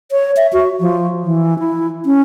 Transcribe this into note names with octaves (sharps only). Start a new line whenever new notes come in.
C#5
E5
F#4
F3
E3
E4
C#4